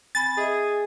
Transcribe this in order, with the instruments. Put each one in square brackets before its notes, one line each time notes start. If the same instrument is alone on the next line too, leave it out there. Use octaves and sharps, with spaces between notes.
[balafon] C4 G#5 B5 [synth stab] A6
[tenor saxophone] G#4 [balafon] D#5 E5